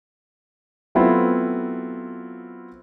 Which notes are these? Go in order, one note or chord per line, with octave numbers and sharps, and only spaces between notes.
F#3 A3 B3 C4 E4 F4